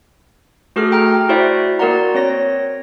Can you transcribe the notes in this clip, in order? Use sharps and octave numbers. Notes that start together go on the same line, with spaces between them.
A3 F#4 G#4 A4 F6
G5 A#5 F6
E4 F#4 C5 D5 E5
A#3 F#4 A#4 D5 F#5 A#5
C4 C#5 A#6